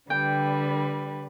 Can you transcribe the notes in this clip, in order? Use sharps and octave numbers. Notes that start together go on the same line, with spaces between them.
D3 G3 B4 G5